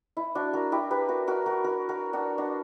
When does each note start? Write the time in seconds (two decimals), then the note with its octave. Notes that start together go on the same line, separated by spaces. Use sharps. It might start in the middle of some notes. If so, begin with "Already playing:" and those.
0.17 E4
0.35 D4 F#4
0.53 F#4 A#4
0.72 E4 G4
0.91 G4 B4
1.09 F#4 A#4
1.27 F#4 A#4
1.46 F#4 A#4
1.64 F#4 A#4
1.89 F#4 A#4
2.13 D4 F#4
2.38 D4 F#4